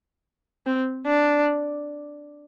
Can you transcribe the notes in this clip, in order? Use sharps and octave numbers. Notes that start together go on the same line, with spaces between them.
C4
D4